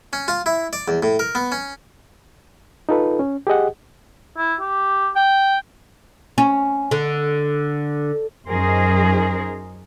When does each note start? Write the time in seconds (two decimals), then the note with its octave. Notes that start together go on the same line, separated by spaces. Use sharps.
0.13 C#4
0.28 F4
0.46 E4
0.73 D5
0.88 E2
1.03 A2
1.19 A#4
1.35 B3
1.52 C#4
2.89 D#4 F4 A4 B4
3.19 C#4
3.47 G4 G#4 D#5 F#5
4.38 E4
4.60 G4
5.16 G5
6.38 C#4
6.91 D3
8.48 F#2 D#4 G#4 A#4 C5